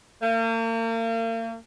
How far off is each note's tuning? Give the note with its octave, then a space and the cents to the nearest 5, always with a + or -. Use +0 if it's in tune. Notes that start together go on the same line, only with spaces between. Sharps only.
A#3 -40